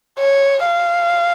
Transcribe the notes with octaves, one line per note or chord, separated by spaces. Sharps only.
C#5
F5